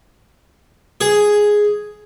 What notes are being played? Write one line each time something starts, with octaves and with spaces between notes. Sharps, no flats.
G#4